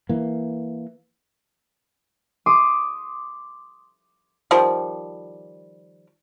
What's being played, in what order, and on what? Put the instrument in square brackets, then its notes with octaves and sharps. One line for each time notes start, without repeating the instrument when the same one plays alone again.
[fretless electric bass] E3 A#3
[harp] C6 D6 D#6
[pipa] D#3 F3 G3